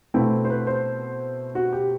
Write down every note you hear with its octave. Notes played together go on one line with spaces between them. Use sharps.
B2 A3 C4 E4 G5
C5
B4
C5
F#4
G4